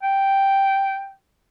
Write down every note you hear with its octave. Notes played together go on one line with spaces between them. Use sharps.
G5